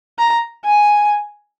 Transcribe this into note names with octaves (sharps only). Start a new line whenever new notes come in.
A#5
G#5